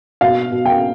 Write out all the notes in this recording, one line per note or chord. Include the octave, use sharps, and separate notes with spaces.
B2 F5
B2
G5